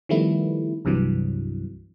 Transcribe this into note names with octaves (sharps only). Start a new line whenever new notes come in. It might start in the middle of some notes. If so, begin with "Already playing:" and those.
D#3 F3 G3 A3 B3 E4
C2 G2 C3 E3 F#3